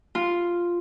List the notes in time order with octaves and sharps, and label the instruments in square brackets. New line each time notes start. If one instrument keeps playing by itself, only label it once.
[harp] F4